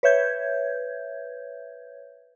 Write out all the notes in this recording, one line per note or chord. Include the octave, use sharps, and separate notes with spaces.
B4 C#5 E5 G6 G#6